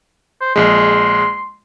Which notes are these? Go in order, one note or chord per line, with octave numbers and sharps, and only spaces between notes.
C5
A#1 G#3 C6